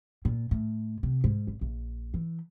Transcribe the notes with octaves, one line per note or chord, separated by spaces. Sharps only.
A#2
A2
C3
G#2
G#1
A#1
E3